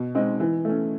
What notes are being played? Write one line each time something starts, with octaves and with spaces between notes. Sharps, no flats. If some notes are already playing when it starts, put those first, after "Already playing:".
Already playing: B2
G#3 C4 D#4
E3
A3 C#4